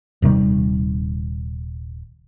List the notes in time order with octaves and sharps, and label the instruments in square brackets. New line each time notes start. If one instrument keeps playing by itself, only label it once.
[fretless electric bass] D#1 C3 D#3 G3